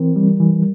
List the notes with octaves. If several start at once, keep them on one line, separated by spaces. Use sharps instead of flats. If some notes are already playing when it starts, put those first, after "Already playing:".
Already playing: E3 C4 A#4
G3
E3